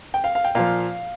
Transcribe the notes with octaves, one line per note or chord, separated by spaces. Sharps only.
G5
F5
F5
G5
A#2 F3 F5